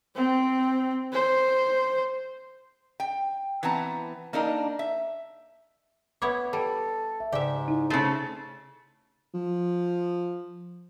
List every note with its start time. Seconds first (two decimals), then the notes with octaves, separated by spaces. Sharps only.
0.15 C4
1.13 C5
3.00 G5
3.63 E3 B3 C4 A5 A#5
4.33 A#3 D4 D#4 A#4 D#5
4.79 E5
6.22 B3 E4 C#5 D6
6.53 G3 A4
7.20 E5
7.33 G#2 C#3 G4 D5 E5
7.68 D#4 E4
7.90 C#3 A3 C5
9.34 F3